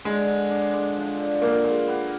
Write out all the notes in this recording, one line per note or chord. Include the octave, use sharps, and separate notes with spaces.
D3 G#3
D3
D4
G#3 D4
F3
D3
F3 A#3
G#3
B3